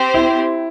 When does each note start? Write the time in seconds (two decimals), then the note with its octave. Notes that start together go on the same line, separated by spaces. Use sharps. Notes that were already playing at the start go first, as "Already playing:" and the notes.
Already playing: C4 G4 C5
0.14 E4